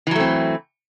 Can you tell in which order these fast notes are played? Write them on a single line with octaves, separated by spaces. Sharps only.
E3 F#3 A3 C4